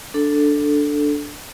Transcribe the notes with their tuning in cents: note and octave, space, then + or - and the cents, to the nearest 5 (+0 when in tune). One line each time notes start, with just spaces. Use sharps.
D4 +0 A4 +0